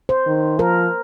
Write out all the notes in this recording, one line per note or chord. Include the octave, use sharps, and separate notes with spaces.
C5
D#3
F3 A#4